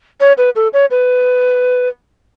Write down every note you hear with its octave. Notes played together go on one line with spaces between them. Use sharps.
C#5
B4
A4
C#5
B4